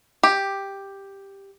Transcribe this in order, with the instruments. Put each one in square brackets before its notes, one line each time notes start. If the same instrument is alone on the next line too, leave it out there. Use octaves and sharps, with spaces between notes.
[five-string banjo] G4